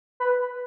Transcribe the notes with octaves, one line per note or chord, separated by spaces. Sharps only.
B4